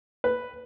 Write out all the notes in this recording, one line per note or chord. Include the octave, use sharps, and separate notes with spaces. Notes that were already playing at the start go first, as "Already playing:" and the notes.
B4